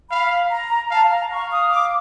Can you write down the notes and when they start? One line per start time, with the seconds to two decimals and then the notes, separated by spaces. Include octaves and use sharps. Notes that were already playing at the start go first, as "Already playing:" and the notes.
0.10 F5 B5
0.51 A#5
0.90 F5 A5
1.10 A#5
1.30 F5 C#6
1.51 D#6
1.70 D6